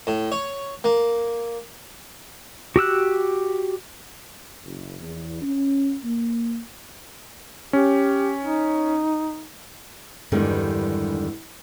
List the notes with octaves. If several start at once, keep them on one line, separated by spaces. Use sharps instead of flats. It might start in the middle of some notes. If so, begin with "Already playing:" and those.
A2
C#5
A#3
F#4 G4 E6 F#6
F#1
E2
C#4
A#3
C#4 G4
D#4
E2 G2 D3 D#3 G3 G#3